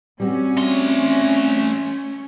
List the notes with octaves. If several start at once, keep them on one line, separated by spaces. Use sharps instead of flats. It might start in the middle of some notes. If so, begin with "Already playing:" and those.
G3 C4 C#4 F#4
A3 C6